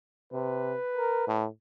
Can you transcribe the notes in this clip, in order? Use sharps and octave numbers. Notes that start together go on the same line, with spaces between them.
C3 B4
A#4
A2